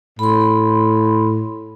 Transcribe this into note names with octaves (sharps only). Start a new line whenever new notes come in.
A2 B5 C6